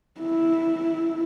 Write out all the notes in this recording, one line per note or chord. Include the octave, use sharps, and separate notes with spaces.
E4